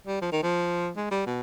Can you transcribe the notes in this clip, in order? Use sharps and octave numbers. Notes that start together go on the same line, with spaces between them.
G3
F3
D#3
F3
G#3
G3
B2